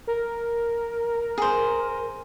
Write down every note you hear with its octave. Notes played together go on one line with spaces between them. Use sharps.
A#4
G#4 C5